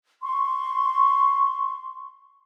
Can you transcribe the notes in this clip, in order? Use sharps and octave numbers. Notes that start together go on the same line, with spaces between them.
C6 C#6